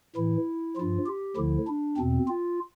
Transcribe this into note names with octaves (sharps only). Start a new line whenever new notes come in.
A2 E3 E4
G2 F3 F4
G4
D2 D3 F3 E4
D4
E2 B2 C4
F4